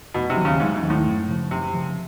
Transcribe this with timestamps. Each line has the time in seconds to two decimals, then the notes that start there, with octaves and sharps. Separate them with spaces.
0.14 F1 B2
0.30 C3
0.37 D#2 D#3 F#3
0.45 C#3
0.60 F1 G#2
0.76 G#2
0.82 D#2 D#3 F#3
0.90 A2
1.06 F#2
1.28 C#3 F3
1.50 F#2 C3
1.73 C#3 F3